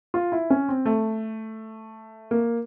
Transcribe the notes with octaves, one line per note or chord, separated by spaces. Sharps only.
F4
E4
C#4
C4
A3
A#3